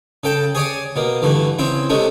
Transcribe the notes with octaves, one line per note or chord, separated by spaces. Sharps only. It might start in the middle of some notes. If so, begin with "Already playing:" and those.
C#3 A4 G5 A5
G#4 C#5 D5 G#5
B2 A#3
G2 D3 E3 A3
C#3 C4 E4
C3 G#3 A3 C#4